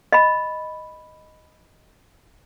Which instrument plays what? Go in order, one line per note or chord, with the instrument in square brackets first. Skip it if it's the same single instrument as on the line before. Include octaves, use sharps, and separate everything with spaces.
[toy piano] D#5 B5